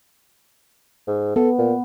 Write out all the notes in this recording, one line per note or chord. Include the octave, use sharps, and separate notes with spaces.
G#2
B3 A4
A#2